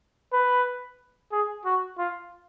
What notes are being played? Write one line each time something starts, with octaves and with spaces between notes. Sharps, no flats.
B4
G#4
F#4
F4